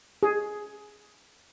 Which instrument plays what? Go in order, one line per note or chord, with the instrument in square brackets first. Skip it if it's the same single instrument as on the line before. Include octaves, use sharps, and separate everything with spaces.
[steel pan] G#4